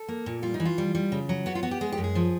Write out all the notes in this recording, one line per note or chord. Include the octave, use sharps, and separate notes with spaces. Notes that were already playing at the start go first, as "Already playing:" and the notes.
Already playing: A4
A#3
A#2
G3 F4
D#4
E3
F4
G3
G3
C#3
F#3
B3 F#4
F4
B3 F#4
G4
G#3 G#4
G4
F#2
G#4
F3